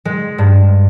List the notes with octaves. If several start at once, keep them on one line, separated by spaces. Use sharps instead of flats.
G#3
G2